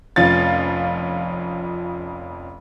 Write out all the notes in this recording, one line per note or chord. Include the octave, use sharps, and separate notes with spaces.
F1 F2 F3 C#4 F5 A6